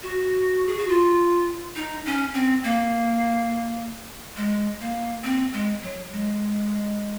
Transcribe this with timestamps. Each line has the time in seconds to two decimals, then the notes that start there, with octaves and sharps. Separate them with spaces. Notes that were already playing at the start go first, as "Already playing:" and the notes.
0.03 F#4
0.67 G#4
0.78 F#4
0.89 F4
1.76 D#4
2.05 C#4
2.34 C4
2.64 A#3
4.37 G#3
4.81 A#3
5.24 C4
5.53 G#3
5.82 F#3
6.12 G#3